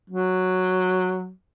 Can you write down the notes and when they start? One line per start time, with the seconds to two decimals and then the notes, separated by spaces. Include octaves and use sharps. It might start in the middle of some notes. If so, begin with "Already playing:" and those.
0.10 F#3